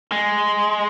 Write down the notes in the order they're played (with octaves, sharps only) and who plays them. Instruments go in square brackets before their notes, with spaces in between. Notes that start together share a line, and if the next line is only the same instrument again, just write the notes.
[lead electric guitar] G#3